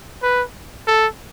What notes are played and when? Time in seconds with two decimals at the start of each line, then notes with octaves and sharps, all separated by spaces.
0.23 B4
0.87 A4